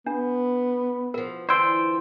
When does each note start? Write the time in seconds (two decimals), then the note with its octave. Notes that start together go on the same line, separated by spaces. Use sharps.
0.06 B3 D4
1.14 B2 F3 A#4
1.49 D3 E3 F4 C5 D5 G5 C6 E6